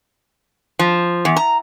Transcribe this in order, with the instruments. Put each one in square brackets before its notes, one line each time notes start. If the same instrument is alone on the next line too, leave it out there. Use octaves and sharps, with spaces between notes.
[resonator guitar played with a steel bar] F3
E2
A#5